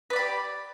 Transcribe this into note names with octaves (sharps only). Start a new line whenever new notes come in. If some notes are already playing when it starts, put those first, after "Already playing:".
G4 B4 D5 B5